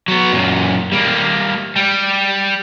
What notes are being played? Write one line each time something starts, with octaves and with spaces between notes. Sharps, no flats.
F#3 B3
F#2 A#2
G3 A#3
G3